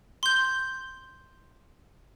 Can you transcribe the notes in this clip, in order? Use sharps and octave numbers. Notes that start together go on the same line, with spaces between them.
C6 G6